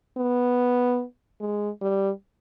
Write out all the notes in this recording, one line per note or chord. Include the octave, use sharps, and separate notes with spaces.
B3
G#3
G3